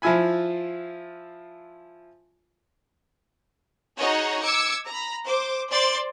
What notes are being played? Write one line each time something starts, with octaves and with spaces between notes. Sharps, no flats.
F3 E4 F4 E5 G#5 B5
D#4 F#4 G#4 C#5 D#5
D6 E6 G#6 C#7
A#5 B5
C5 D6
C5 D5 C6 A6